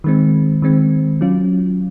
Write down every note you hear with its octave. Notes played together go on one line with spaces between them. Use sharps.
D#3 G#3 C4
D#3 G#3 C4
F#3 C#4 F4